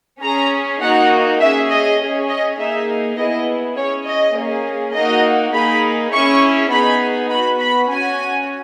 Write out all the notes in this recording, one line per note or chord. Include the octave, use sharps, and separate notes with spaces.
C#4 G#4 A#5
A#3 D#4 F#4 F#5
C#4 G#4 E5
D#5
C#4 G#4
D#5
A#3 D#4 G#4 E5
B3 E4 G#4 D#5
C#4 G#4 C#5
D#5
A#3 C#4 G#4
A#3 D#4 F#4 D#5
A#3 D#4 G#4 B5
C#4 E4 G#4 C#6
B3 D#4 G#4 B5
B3 F#4 B5
B5
C#4 F#4 G#5